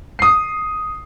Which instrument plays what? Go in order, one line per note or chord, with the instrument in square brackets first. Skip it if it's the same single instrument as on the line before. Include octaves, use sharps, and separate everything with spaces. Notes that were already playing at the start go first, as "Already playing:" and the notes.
[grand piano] D#6 C7